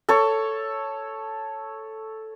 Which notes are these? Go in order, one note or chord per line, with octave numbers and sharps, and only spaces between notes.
A4 C#5